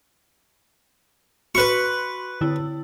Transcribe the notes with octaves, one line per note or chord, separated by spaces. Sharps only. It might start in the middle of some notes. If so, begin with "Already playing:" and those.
F#4 B4 C6 C#6
D3 E4 E6